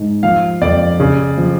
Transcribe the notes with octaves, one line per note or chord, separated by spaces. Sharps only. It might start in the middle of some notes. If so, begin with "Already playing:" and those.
Already playing: G#2
F3 F5
F2 D5
C#3
F3